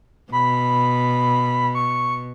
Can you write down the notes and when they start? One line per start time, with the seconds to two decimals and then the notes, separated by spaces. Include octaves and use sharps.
0.32 B2 B5
1.75 C#6